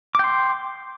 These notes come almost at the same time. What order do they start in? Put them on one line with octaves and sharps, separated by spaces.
D6 G5 C6